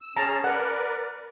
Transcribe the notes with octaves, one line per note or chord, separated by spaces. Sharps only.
E6
C#4 G#4 A5 A#5
A#4 B4 D5 F#5